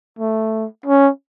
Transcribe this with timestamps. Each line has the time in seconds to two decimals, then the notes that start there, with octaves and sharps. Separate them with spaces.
0.19 A3
0.86 C#4